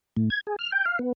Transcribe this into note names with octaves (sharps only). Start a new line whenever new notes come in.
A2
G#6
G#4
F6
G5
F5
B3